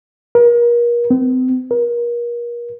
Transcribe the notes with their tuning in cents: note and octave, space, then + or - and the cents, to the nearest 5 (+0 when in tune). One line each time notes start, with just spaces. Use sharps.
A#4 +35
C4 -40
A#4 +35